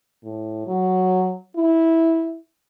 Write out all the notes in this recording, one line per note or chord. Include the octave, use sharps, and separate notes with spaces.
A2
F#3
E4